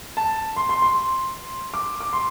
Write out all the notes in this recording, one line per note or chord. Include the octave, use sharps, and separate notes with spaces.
A5
C6
C6
C6
D6
D6
C6